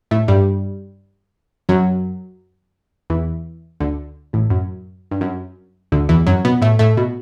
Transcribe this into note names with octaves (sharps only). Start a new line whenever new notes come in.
A2 A3
G2 G3
F#2 F#3
E2 E3
D2 D3
A1 A2
F#2
G2
F#2
D2 D3
E2 E3
F#2 F#3
B2 B3
A2 A3
A2 A3
B2